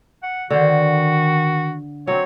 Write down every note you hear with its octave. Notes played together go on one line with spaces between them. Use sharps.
F#5
D3 D#3 F#4 C5
F#3 C4 C#5